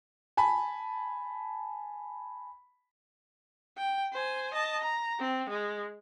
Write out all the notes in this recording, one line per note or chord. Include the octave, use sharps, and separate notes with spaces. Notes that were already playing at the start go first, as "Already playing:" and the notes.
G#5 A5 B5
G5
C5 G#5
D#5 A5
A#5
C4
G#3